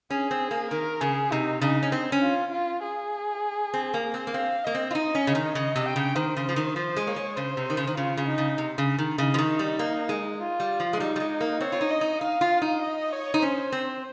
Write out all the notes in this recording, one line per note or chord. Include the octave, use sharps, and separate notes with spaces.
C#4 G#4
C4
A#3
D#3 A#4
C#3 G#4
C3 D#4
C#3 D#4
C#4
C4
C#4
F4
F4
G#4
C4
A#3
C4
A#3
C4 F5
A#3 D#5
C4
F4
D#4 D#5
C#4
C#3
D#3
C#3 D#5
C3
G5
C#3
D#3 C5
C#3
F3
D#3
F3 C5
G#3
A#3 C#5
G#3
C#3 C5
C3
D#3
C#3
D#3
C#3 F4
C#3
D#4
C#3
C3
C#3
D#3
C#3 D#4
F3
D#3
G3
A#3
G#3
F4
G3
F3
G#3
G3 D#4
G3
G#3
A#3
C4 C#5
F4
D#4
D#5
D#4
D#4 F5
F4
D#4
D#5
C#5
D#4
C#4 C5
C4